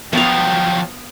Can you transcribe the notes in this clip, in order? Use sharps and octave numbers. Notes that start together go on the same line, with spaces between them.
F3 F#3 B3 F5 G5